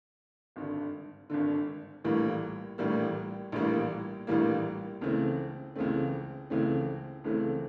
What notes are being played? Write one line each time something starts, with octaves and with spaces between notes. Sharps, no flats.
G#1 G2 D3
G#1 G2 D3
A#1 A2 E3 G3 A#3
A#1 A2 E3 G3 A#3
A#1 A2 E3 G3 A#3
A#1 A2 E3 G3 A#3
C#2 C#3 E3 A3 C4
C#2 C#3 E3 A3 C4
C#2 C#3 E3 A3 C4
C#2 C#3 E3 A3 C4